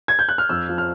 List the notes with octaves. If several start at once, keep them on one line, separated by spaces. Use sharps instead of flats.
G#6
G6
F#6
F6
F2 E6
F3
F6